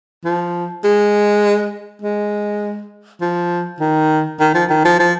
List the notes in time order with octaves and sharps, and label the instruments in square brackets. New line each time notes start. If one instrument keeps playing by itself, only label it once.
[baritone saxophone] F3
G#3
G#3
F3
D#3
D#3
F3
D#3
F3
F3